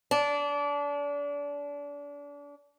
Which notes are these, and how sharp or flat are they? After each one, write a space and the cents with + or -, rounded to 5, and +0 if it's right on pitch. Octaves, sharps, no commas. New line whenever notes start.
D4 -30